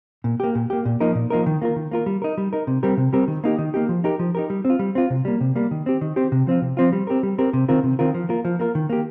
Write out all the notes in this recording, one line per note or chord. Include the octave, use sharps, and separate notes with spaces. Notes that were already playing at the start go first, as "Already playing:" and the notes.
A#2
A#3 G4
A#2
A#3 G4
A#2
F3 A#3 D#4 A#4
A#2
F3 A#3 D#4 A#4
D#3
A#3 F4 A#4
D#3
A#3 F4 A#4
G3
D#4 A#4
G3
D#4 A#4
C3
G3 C4 G4 A#4
C3
G3 C4 G4 A#4
D#3
A#3 D#4 G4
D#3
A#3 D#4 G4
F3
D#4 G4 A#4
F3
D#4 G4 A#4
G3
C4
F4
G3
C4 F4
C3
G3 A#3
C3
G3 A#3
D#3
C4 G4
D#3
C4 G4
C3
F3 C4 F4
C3
F3 C4 F4
G3
C4 G4 A#4
G3
C4 G4 A#4
C3
D#3 C4 F4 A#4
C3
D#3 C4 F4 A#4
F3
A#3 F4 A#4
F3
A#3 F4 A#4
D#3
A#3 G4